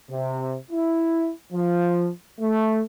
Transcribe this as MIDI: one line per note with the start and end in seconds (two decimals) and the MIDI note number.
0.11 0.56 48
0.71 1.31 64
1.53 2.09 53
2.40 2.81 57